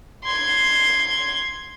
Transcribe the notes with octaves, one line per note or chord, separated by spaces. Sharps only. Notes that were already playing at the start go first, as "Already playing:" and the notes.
C6 G#6